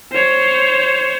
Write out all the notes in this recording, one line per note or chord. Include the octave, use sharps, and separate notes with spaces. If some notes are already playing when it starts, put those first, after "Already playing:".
C5 C#5